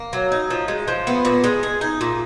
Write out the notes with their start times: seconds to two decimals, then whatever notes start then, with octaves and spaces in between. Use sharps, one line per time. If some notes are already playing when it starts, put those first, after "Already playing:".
Already playing: A#3
0.13 F#3
0.32 D#4
0.50 F3
0.68 G#3
0.88 F3
1.07 B3
1.25 A#2
1.44 G#3
1.63 G#4
1.81 D#4
2.01 A#2